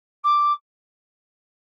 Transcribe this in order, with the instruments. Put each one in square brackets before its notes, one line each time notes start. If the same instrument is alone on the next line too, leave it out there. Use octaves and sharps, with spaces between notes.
[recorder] D6